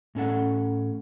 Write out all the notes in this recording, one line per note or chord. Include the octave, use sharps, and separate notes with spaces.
A2 C#4 A4 F#5